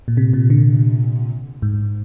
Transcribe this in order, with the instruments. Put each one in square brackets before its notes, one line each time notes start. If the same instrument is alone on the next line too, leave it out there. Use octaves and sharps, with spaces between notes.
[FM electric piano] A#2
C3
A#2
D3
G#2